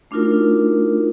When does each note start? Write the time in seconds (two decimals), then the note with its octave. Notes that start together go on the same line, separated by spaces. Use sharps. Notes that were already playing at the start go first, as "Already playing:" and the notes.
0.11 A3 D4 D#4 F4 F#4 A#4